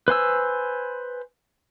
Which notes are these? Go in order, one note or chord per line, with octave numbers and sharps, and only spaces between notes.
B4 C5 G#5 E6